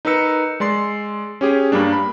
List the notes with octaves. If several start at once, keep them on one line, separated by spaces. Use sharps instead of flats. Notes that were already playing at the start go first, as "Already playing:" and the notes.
D#4 A#4 B4 E6 C#7
G#3 D5 C6 C7
C#4 G4 G#4
G2 G3 A#3 D4
B5